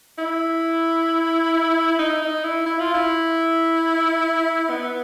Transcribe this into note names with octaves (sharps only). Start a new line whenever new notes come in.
E4
D#4
D#4
E4
E4
F4
E4
B3